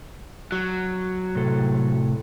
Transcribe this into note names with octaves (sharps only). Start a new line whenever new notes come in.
F#3
A2 C3 A4